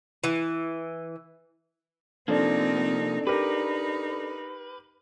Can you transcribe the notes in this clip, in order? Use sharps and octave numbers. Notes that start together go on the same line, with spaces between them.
E3
C3 F3 A#3 C4 D4 D#4 A4 D5
D#4 G4 A#4 B4